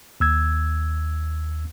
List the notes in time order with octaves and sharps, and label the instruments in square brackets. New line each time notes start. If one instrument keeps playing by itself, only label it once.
[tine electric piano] D#2 E6 G#6